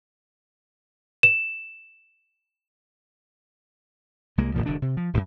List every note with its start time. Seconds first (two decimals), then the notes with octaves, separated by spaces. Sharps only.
1.23 E7
4.38 C2 G#3 A#3
4.54 G1 D2 A#2 F3
4.66 E1 D3 D#3 D4
4.82 C3
4.97 F3
5.13 D1 F#2